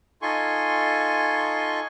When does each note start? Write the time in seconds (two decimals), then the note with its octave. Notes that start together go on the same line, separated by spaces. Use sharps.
0.22 D#4 F4 A4 G#5 C6 C#6